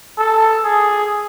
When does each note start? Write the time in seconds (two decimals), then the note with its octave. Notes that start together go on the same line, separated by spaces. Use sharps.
0.18 A4
0.64 G#4